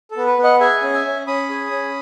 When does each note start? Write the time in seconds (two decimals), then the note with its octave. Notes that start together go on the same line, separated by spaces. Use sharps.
0.11 A4
0.17 B3
0.26 B4
0.38 B3
0.44 D#5 F#5
0.60 G#4 E5 G#5
0.82 C#4
0.93 E5 G#5
1.05 C#4
1.27 C#4 B5 D#6
1.49 G#4
1.71 C#4